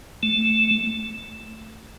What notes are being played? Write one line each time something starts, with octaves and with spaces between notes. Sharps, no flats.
A3